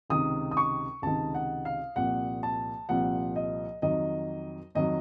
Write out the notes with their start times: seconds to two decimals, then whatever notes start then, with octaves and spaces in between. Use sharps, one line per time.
0.10 C#2 C3 D#3 D#6
0.51 D#6
0.57 C#6
1.02 C#2 C3 D#3 A5
1.34 F#5
1.65 F5
1.96 C2 A#2 F3 F#5
2.43 A5
2.89 C2 A#2 F3 F#5
3.36 D#5
3.82 F2 D#3 F#3 D#5
4.75 F2 D#3 F#3 D#5